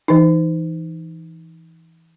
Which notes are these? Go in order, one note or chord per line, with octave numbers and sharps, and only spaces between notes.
E3 D#4